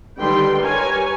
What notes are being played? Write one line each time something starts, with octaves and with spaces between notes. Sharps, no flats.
D3 D#3 G3 B4 G5 C6
G3 G4 A#4 B4 C#5 G#5